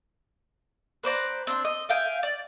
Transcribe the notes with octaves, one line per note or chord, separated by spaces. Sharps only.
B4 C5 D5 A#5
C4 D4 C6
D#5
E5 F5 G5 G#5
D5